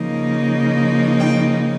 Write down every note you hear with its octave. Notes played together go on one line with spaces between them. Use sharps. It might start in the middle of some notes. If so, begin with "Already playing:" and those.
Already playing: C#3 F3 A#3 D#4
G5